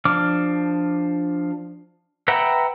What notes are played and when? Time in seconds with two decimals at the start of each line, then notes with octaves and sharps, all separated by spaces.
0.05 F3 D4 D6 F6
2.28 B4 E5 F#5 G5 A#5